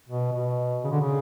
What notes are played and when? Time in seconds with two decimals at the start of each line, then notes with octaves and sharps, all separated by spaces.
0.09 B2
0.33 B2
0.84 C#3
0.91 D3
1.00 C#3